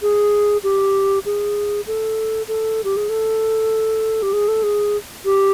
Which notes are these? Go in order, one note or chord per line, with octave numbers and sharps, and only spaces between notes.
G#4
G4
G#4
A4
A4
G4
G#4
A4
G4
G#4
A4
G#4
G4